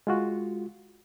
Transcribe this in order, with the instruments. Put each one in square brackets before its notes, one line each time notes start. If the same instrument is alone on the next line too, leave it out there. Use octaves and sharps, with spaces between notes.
[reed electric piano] G#3 F4 F#4